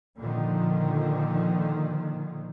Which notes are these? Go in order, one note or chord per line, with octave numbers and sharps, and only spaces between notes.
A#2 D3 D#3 F3